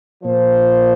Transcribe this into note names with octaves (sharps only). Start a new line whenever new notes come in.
A#2 F3 C5